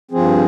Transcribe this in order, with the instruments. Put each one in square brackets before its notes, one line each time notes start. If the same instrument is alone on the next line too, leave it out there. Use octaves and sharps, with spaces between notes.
[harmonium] G2 F3 C4 G#4